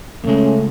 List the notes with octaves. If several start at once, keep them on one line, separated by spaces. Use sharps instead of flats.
E2 C#3 G#3 A3 C#4